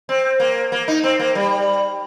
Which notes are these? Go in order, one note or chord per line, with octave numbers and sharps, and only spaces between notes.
C4
A#3
A#3
D#4
C4
A#3
G3